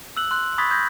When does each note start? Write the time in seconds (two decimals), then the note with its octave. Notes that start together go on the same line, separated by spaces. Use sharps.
0.17 E6 F#6 F#7
0.31 C6 F#6
0.58 B5 C#6 D#6 G#6 A6 B6
0.70 D#6 G6 G#6 A#6